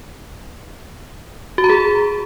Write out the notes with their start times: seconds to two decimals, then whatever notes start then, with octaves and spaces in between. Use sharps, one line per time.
1.58 F#4
1.64 A#5
1.70 G#4